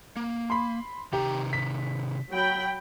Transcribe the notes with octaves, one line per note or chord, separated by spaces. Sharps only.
A#3
B5 C6
C3 D#3 G4 A#5
B6
F#3 G5 B5